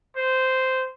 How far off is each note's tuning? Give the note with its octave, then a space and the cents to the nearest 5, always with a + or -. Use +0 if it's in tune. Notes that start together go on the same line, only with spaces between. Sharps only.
C5 -10